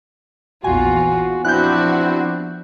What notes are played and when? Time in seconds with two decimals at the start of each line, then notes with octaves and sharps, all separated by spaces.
0.64 A#1 E2 F4 F#4 G#5
1.45 F3 B3 C4 D4 E4 F#4 F#6 G6